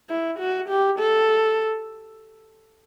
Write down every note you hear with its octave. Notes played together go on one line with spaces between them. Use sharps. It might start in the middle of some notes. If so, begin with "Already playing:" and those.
E4
F#4
G4
A4